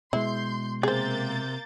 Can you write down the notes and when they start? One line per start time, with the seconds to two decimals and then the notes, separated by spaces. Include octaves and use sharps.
0.13 B2 G#3 E4 C6 G6
0.83 C3 A#3 G#4 C5 G6 A6